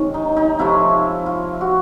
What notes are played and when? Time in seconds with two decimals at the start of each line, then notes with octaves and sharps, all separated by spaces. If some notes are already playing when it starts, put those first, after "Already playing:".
Already playing: C3 D#3 G#3 C#4
0.14 D#4
0.36 D#4
0.59 C3 F3 A3 E4
1.26 F4
1.61 F#4